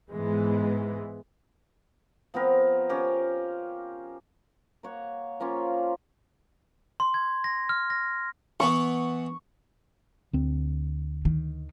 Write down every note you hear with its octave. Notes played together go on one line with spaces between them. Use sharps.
G#2 E3 G#3 B3
F3 B3 C4 A#4
F3 C#4 G4 A#4
A#3 C#5 F#5
F3 A#3 C#4 F4
C6
G#6
A#6
F6
A#6
E3 B3 C#6
D2 C4
D#3